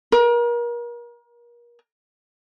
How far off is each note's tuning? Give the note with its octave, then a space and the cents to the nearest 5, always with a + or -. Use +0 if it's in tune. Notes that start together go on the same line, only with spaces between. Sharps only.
A#4 +35